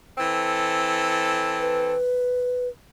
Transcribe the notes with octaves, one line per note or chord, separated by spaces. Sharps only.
E3 C4 A4
B4